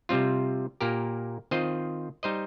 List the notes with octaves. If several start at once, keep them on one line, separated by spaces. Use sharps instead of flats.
C3 G3 C4 F4
A#2 A#3 G4 A#4
D#3 C4 F4 C5 D#5
G3 D#4 C5 D#5